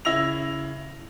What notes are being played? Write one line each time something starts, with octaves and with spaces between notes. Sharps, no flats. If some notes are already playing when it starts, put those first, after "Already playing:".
C#3 E4 E6 A#6 F7